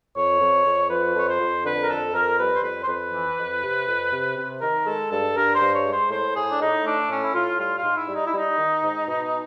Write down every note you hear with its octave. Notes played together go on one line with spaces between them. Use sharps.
F2 C#5
F2
F2
F3 B4
F2 C#5
C5
F2
D3 B4
A#4
F2 A4
F2 A#4
G3 B4
C5
F2 B4
C5
F2 B4
E3
F2
C3
F2
C3
C3
D#3 A#4
G#3 A4
G2 A4
G2 A#4
C5
G2
C#5
G#3
C5
A2 C5
A2 G#4
D4
A2 D#4
A3 D4
A2 C#4
E4
A2 F4
G3 F4
F4
G#2
E4
G3
D#4
E4
G3 D#4
D#3
G#2
B2